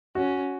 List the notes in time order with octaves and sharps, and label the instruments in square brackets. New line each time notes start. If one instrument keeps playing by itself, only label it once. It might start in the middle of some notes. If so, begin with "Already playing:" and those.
[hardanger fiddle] C#4 [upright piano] F#4